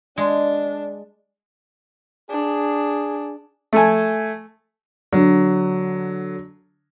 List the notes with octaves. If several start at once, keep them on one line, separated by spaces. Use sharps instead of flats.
G#3 D4
D4 G#4
A3 A4 G#5
D3 F#3